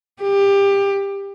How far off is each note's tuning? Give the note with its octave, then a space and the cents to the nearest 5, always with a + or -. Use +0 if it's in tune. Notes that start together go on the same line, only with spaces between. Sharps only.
G4 +20